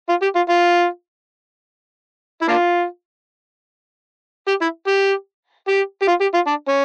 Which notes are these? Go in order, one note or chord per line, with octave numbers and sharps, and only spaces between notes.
F4
G4
F4
F4
E4
A#3 D4 F4
G4
E4
G4
G4
G4
F4
G4
F4
D4
C#4